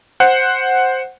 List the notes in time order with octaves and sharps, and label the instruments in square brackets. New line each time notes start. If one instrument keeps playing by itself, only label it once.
[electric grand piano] C5 F#5